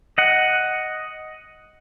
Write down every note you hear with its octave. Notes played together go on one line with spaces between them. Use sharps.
D#5 F#5